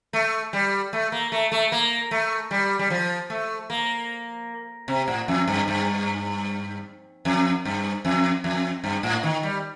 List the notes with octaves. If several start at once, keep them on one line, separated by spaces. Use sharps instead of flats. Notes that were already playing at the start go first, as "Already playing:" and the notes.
A3
G3
A3
A#3
A3
A3
A#3
A3
G3
G3
F3
A3
A#3
C3
A2
F2
G2
G2
F2
G2
F2
F2
G2
A2
D#3
G3